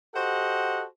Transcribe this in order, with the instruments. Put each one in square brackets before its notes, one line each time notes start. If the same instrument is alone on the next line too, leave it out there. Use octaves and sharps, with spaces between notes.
[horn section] F#4 G4 A4 C5 D#5 F#5